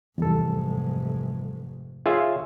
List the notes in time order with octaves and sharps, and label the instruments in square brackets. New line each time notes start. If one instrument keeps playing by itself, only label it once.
[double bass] F1 G#2 [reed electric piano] E2 G3 A4
[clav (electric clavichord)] F4 G#4 E5 [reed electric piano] C#5